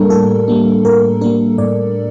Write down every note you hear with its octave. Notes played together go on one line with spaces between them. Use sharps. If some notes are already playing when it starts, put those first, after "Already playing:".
Already playing: A2 G3 A#3 D4 A4 A#4
A2 A4
G3 A#3 D4
A2 A#4
G3 A#3 D4 A#4
A2 D5